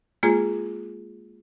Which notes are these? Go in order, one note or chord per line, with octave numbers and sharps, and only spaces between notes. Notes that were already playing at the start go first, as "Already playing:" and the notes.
G#3 A#3 F4 G#4